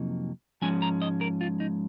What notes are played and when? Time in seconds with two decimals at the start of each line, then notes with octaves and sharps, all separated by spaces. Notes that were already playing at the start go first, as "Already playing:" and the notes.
Already playing: F2 C3 F#3 A#3 D#4
0.62 G#2 F3 G#3 C#4 G#5
0.82 A#5
1.02 D#5
1.21 A#4
1.41 F4
1.60 D#4